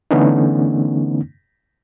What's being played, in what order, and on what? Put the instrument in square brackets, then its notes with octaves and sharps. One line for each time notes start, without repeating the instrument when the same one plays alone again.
[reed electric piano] D3 E3 A3 B3 C#4 D#4